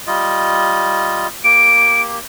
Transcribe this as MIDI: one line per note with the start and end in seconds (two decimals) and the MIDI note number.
0.07 1.28 55
0.07 1.28 65
0.07 1.28 75
1.44 2.19 58
1.44 2.19 67
1.44 2.02 98